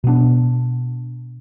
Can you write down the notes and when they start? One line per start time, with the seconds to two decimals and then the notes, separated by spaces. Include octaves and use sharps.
0.04 B2 B3 D4